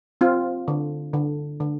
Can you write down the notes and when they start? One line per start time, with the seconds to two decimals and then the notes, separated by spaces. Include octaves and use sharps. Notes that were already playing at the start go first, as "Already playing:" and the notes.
0.21 C4 F4
0.68 D3
1.13 D3
1.60 D3